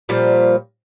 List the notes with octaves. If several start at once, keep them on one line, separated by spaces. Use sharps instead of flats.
A#2 F3 G3